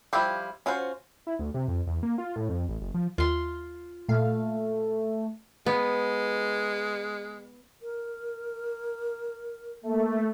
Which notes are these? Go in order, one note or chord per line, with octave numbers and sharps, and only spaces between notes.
F3 G3 E4 F4 G4
C#4 F4 F#4 C5
E4
D2
C3
F2
E2
A#3
F4
A2
F2
A1
F#1
F3
D#2 F4 C6
A#2 A3 F5
G#3 B3
A#4
A3 A#3